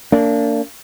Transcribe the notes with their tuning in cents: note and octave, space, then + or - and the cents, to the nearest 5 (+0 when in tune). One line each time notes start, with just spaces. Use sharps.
A#3 -35 D4 -25